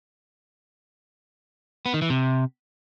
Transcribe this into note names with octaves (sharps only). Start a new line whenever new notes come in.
B3
D#3
E3
C3